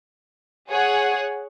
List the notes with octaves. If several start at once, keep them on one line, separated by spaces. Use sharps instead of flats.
G#4 C#5 F#5